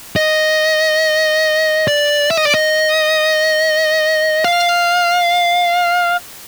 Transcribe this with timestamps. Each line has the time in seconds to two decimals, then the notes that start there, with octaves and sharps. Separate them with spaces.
0.16 D#5
1.88 D5
2.30 E5
2.37 D#5
2.45 D5
2.54 D#5
4.44 F5